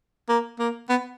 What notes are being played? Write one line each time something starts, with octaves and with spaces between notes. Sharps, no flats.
A#3
A#3
B3